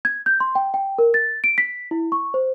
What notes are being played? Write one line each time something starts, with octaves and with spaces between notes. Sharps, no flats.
G#6
G6
C6
G5
G5
A#4
A6
D7
B6
E4
C#6
C5